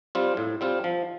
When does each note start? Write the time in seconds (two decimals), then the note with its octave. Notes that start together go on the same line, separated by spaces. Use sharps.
0.15 G3 C4 F4
0.37 A2
0.61 G3 C4 F4
0.84 F3